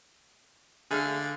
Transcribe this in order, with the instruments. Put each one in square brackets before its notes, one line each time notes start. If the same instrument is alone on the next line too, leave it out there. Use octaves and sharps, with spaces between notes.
[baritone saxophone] D3 [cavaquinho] G#4 E5 F5